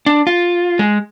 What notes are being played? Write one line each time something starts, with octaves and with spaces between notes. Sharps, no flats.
D4
F4
G#3